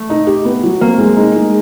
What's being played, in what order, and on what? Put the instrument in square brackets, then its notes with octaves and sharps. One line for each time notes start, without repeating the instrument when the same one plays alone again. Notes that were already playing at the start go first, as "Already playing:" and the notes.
Already playing: [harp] A3
[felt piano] D#4
G4
B3
F#3
[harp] A#3 [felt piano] C4
[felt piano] G#3
D#4
G#3